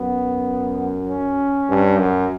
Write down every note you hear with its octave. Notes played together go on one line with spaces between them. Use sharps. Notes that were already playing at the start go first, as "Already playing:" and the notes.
Already playing: F#2 B3
C#4
G2
F#2